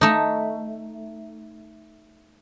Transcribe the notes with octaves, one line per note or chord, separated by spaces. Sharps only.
A3 D#4